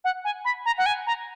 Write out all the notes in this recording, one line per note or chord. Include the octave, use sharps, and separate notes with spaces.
F#5
G#5
B5
A#5
F#5
G#5
A#5